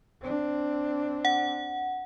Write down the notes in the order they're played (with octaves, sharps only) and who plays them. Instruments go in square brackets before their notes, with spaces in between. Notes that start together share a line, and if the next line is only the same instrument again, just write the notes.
[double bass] C4 D4
[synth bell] F#5